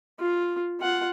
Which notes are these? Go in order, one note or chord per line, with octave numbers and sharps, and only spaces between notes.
F4
F4 F#5